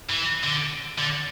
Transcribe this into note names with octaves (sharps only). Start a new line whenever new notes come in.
E3
D3
D3